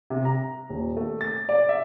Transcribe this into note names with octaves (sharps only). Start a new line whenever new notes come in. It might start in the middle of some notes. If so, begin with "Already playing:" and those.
C3
A#5
D#1
A3
A6
D5
E5